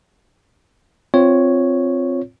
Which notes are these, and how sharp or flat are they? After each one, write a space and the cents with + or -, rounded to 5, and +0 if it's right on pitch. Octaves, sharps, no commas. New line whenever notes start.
C4 +0 F4 +0 C#5 +0